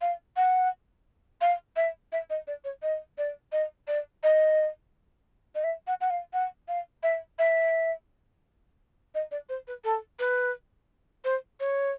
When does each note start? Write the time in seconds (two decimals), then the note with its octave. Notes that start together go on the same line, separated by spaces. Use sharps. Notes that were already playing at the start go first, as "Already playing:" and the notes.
0.01 F5
0.37 F#5
1.41 F5
1.76 E5
2.12 E5
2.30 D#5
2.47 D5
2.64 C#5
2.82 D#5
3.18 D5
3.52 D#5
3.88 D5
4.23 D#5
5.55 D#5
5.64 E5
5.87 F#5
6.01 F#5
6.10 F5
6.33 F#5
6.68 F5
7.03 E5
7.39 E5
9.15 D#5
9.31 D5
9.49 C5
9.68 B4
9.84 A4
10.19 B4
11.25 C5
11.60 C#5